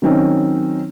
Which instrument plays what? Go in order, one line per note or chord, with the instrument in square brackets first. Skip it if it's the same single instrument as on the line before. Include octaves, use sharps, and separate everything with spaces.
[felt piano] D#3 F#3 C4 C#4 D#4